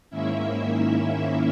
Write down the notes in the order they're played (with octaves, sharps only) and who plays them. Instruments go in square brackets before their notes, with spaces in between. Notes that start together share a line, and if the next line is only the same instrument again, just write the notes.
[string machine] G#2 D#3 A#3 C#4 E4 E5